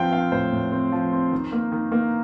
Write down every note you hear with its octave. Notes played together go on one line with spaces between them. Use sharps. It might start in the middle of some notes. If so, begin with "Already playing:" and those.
Already playing: F3 C4 F5 G5
C4 F5
A2 C5
A2
C4
F3
C4
D#3
A#3
D#3
A#3